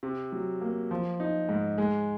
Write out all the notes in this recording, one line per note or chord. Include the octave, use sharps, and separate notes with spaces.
C3
F#3
A#3
F3
D#4
G#2
G#3